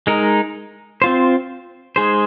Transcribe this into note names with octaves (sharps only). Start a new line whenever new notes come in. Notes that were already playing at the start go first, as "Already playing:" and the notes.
G#3 D#4 A#4
C4 F4 C5
G#3 D#4 G#4 C5